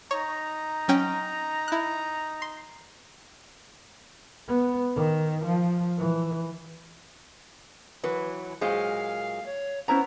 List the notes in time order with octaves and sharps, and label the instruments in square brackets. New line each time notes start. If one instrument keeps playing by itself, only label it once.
[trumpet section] D#4 A#5 [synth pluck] C#5
[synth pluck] F#3 C#4 G5
E4 F#6
C6
[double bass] B3
D#3
F3
E3
[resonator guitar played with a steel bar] E3 F#3 [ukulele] B4
[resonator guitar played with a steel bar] A#2 F#3 G#3 [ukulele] C5 [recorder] F5
[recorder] C#5
[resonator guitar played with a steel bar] B3 [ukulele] C#4 E4 A#5 [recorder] C5